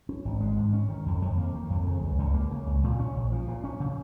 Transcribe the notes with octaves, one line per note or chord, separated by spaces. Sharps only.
C#4
G#1
G#3
G#2
C#4
D#3
F2
F2
A#3
D#3
F2
C#3
C#2
C#2
A#3
C#3
C#2
A#2
C#4
A#1
F3
A#2
C#4
C#3